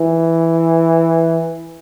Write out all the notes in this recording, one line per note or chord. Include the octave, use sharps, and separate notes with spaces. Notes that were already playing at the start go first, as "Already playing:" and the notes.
Already playing: E3